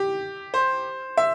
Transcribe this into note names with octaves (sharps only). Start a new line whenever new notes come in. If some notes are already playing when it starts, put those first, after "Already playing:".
Already playing: G4
C5
E5